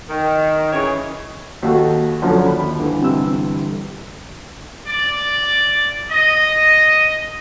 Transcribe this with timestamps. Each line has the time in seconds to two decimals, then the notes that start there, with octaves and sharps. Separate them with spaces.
0.09 D#3
0.73 C#3 E3 G#4 C#5
1.63 D#2 F#4 A4
2.22 F#2 D3 F3
2.46 D#2 B5
2.79 G2 D3 E3
3.02 C3 E6
4.87 D5
6.09 D#5